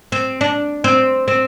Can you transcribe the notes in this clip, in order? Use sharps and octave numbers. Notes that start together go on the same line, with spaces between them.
C4
D4
C4
C4